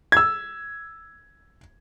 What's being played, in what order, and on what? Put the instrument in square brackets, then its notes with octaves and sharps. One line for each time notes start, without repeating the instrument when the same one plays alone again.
[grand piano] E6 G#6